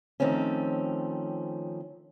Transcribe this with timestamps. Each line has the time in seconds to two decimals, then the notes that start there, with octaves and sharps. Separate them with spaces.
0.20 D#3 F3 A3 C4 C#4